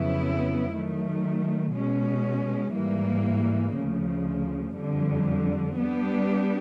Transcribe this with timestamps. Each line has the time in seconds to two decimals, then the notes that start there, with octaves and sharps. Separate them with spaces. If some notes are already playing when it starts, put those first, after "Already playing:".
Already playing: F2 C#3 F#3 B3 E4
0.73 D#3 F#3 A3
1.74 B2 G#3 C#4
2.75 G#2 E3 G3 A#3
3.75 D2 C#3 F3
4.77 F2 D3 G3
5.78 G3 B3 D4 G4